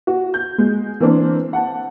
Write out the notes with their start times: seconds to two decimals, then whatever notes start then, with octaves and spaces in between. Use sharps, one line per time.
0.07 F#4
0.34 G6
0.58 G#3
1.00 E3 A#3 C4 D4 C5
1.53 F#5 A5